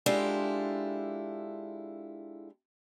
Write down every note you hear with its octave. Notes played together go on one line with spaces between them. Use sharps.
G#3 D4 E4 F4 G4 A4